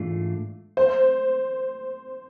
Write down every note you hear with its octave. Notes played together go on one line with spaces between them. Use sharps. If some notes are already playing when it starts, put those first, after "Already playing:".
Already playing: G#2 E3 A3 D4 F4
C5